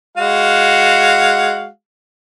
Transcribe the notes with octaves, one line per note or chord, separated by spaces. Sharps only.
G#3 F#4 F5